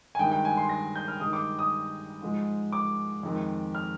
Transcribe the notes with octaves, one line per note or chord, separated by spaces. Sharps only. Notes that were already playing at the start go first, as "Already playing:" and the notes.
G#5
G2 D#3 G#3 G5
G5
G#5
C6
A#6
G6
F6
G2 D#3 G#3 D#6
D6
D#6
G#2 F3 G#3
D6
F2 D#3 G#3
F6